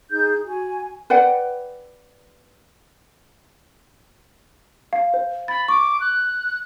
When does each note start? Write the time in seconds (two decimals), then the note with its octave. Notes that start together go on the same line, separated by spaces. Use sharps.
0.11 D#4 G#4 G6
0.44 F#4 G#5
1.10 B4 D5 F#5 G5
4.93 F5
5.14 C5
5.48 B5 A6
5.68 C#6 D6
6.00 F#6